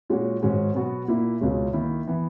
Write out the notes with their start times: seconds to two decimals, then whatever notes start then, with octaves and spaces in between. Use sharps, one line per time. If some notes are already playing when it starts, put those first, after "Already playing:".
0.10 A#2 G#3 C#4 F#4
0.42 G#2 D#3 G#3 C#4 F#4
0.75 B2 F#3 B3 F#4
1.08 A#2 A#3 E4
1.41 C#2 B2 G#3 C#4
1.73 D#3 A#3 E4
2.08 E3 B3